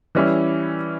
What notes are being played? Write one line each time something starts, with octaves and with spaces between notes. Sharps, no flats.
E3 G3 C#4 E4